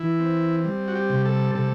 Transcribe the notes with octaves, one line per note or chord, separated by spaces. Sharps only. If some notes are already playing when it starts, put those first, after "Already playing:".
Already playing: E3 E4
C4
G3
F#4
G4
C3
A4
C3 A4